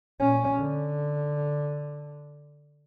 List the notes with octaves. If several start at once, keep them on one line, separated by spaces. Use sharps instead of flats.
A#2 C#4
D3